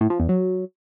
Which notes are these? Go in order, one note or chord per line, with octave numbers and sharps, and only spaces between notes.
A2
F3
E2
F#3